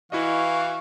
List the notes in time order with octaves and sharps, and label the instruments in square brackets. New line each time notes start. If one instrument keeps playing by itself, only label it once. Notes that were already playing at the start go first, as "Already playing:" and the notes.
[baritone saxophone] E3 [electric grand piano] E4 F#4 D#5 [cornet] F5 [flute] C#6